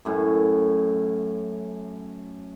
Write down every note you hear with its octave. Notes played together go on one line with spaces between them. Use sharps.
F#2 A2 C#4